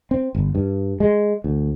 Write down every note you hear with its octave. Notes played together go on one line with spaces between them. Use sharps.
C4
G1
G2
G#3
D2